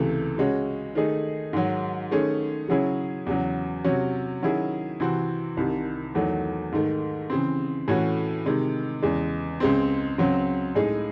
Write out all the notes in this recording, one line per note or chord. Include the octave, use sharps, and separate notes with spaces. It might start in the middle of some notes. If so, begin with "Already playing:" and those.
Already playing: C#2 C3 E3 A3
C#3 G#3 C#4 F#4
D#3 A3 D#4 G#4
G#2 D#3 F#3
D#3 A3 C#4 G#4
C#3 F#3 C#4 E4 G#4
E2 C#3 F#3
C3 F#3 C#4 F#4
D#3 F#3 C#4 E4 G#4
C3 E3 C4 F#4
C2 C3 D#3
E2 D#3 F#3 A3
G#2 D#3 A3
C#3 E3 C4
A2 E3 A3 C#4 F#4
C3 D#3 G#3
E2 C#3 G#3
C#2 C#3 G#3 C4
C#2 C#3 F#3 C4
A2 G#3 D#4 G#4